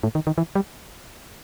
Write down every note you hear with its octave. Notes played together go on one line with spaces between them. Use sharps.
A2
D#3
D#3
E3
G3